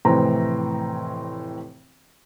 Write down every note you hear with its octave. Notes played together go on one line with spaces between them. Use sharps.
F1 A2 E3 C4 A#5